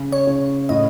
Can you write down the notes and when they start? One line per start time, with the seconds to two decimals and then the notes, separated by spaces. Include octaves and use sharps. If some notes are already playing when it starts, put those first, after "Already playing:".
Already playing: C#3
0.12 C#5
0.27 C#3
0.69 A2 D#5